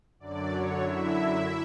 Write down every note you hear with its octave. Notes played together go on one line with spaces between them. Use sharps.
F#2 D3 F#3 D5
C#5
E4 E5